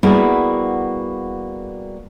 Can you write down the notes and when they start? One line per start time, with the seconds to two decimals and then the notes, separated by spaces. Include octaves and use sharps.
0.03 G3 A#3 B3 E4 F#4 G#4